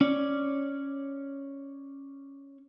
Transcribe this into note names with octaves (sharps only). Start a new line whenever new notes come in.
C#4 C#5 D5